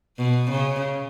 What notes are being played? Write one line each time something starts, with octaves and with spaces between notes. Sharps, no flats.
B2
C#3